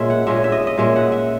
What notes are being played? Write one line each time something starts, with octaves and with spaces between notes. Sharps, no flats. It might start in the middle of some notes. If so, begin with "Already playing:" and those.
Already playing: A#2 G#3 C#4 E5
F#5
A#2 G#3 C#4 E5
E5
D#5
D#5
A#2 G#3 C#4 E5
F#5
E5